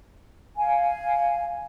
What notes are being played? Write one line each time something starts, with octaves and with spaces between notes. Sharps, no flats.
F5 G#5